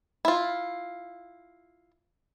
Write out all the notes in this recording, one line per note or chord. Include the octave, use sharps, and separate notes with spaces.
E4 F4